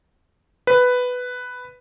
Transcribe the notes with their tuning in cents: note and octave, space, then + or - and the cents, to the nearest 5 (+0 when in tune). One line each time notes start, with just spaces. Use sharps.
B4 +5